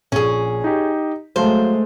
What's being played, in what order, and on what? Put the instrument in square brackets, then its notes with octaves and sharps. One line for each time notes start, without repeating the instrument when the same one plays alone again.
[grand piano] A#1 A#2 [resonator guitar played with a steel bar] C#4 G#4
[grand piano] D#4 G4
[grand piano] F#3 F5 A5 [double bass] G#3 A3 [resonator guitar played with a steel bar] C5